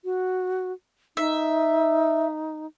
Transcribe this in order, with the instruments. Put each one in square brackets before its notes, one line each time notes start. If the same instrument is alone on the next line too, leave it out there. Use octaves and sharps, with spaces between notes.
[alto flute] F#4
[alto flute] D#4 [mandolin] E5